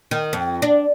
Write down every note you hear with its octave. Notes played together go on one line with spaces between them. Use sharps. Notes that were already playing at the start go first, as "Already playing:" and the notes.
D#3
F2
D4